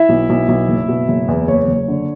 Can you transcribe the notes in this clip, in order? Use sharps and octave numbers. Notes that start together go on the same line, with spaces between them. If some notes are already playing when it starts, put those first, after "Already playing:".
Already playing: E4 E5
B1
B1
B1
F#1
B2
F#1
E2
F#1 C#5
F#1
D3